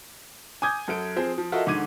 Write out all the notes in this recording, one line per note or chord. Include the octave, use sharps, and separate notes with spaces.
G#5 D6 D#6 G6 G#6
F#2 A4 D7
F3 C4 G#4
F3
F4 F#4 A4 A#4 D#5 E5
G#2 D3 D#3 D6 G#6 D#7